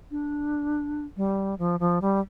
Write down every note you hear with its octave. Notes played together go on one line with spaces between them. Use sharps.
D4
G3
F3
F3
G3